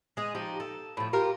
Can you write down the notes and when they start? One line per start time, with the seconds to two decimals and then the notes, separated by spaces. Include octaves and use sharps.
0.17 G#3 G#4
0.35 F3 D#4 G4
0.60 A4
0.97 A2 F3
1.13 F4 G4 A#4